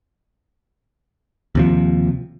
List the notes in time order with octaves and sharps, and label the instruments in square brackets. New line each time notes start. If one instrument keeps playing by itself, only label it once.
[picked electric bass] D#2 C3 F3